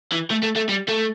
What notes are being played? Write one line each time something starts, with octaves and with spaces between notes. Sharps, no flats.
E3
A3
A3
A3
G3
A3